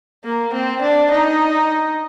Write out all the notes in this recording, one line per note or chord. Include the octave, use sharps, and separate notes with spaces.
A#3
C4
D4
D#4